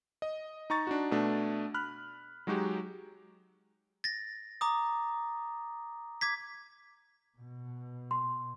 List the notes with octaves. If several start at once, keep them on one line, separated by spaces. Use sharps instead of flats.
D#5
D#4 A#5 C#6 A6
D4 D#4 F#4
B2 A3 D4
B5 F6 F#6
F#3 G#3 D#4 F#4 G4
A6 A#6
A#5 D6 D#6
D6 G#6 B6
B2
C6